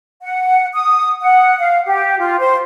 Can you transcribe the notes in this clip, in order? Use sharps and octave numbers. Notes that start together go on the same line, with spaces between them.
F#5
D#6
F#5
F5
G4
F4
C5